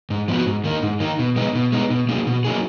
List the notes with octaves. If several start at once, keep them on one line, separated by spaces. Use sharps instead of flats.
G#2
F3 B3 F#4
G#2
D#3 A#3 D#4
G#2
D#3 A#3 D#4
B2
G#3 B3 D#4
B2
G#3 B3 D#4
B2
F#3 A#3 D#4 G#4
B2
F#3 A#3 D#4 G#4